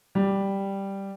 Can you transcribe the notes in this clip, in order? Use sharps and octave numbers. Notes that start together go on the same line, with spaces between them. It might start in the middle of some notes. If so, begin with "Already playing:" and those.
G3